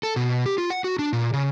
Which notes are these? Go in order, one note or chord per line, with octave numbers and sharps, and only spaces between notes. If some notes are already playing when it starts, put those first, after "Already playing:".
A4
B2
G4
F4
F#5
F#4
D4
A#2
C#3